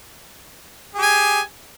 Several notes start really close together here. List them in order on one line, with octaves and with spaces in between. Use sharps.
G#4 G4 G#5